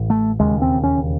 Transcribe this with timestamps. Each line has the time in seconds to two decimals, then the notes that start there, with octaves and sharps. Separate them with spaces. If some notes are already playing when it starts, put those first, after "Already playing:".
Already playing: A1 A2
0.10 A3
0.39 E1 D#2 C#3 G#3
0.62 C4
0.84 C#4